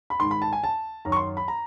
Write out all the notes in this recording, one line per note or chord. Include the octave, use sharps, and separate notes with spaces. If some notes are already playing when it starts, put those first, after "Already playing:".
B5
G#2 D#3 C6
B5
A5
G#5
A5
F#2 D#3 A#5
C#6
C6
B5
A#5